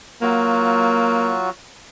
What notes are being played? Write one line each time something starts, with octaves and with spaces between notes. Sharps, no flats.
F#3 A#3 F4 F#4